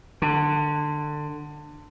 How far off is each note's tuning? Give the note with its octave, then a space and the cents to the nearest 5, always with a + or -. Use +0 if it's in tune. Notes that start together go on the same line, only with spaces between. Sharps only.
D3 +20